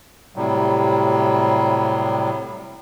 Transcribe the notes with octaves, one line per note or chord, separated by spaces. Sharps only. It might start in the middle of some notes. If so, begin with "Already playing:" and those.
A2 C3 F#3 G3